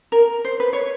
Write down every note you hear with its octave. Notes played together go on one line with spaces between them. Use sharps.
A#4
C5
B4
C#5